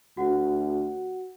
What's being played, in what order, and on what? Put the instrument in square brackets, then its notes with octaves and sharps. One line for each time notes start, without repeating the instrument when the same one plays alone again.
[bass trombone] D2 [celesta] F#4 F#5